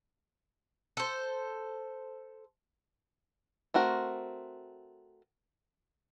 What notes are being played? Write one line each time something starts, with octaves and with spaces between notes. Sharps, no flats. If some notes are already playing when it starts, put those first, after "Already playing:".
A4 C5
A3 C4 F#4 A#4